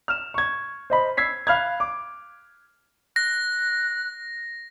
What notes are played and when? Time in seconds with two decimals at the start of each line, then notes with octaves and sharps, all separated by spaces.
0.08 F6 E7
0.34 C#6 G#6
0.90 C5 D#5 B5
1.17 E6 G#6 B6 C7
1.47 F5 B5 F6 F#6 G#6
1.80 D6
3.16 F#6 A#6